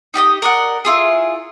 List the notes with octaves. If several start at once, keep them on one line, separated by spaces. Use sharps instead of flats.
D#4 G4 D5 D#5
A#4 D5 D#5 F#5
E4 F4 G#4